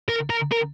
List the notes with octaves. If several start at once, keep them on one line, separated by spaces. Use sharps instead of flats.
A#4
A#4
A#4